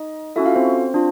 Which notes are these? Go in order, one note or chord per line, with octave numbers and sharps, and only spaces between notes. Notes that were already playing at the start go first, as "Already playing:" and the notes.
Already playing: D#4 D#5
C#4 E4 F#4 A4 E5
F4 F5
C4 C5
D4 F4